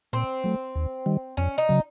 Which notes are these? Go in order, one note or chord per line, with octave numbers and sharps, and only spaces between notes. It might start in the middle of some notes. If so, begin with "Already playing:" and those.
A#2 C4
F#3 A3
D#2
D#3 G3
F2 C#4
D#4
C#3 F#3